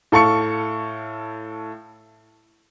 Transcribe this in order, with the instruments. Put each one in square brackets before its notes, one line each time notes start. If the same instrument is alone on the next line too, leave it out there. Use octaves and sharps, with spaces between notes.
[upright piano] A2 A4 F5 C#6 C#7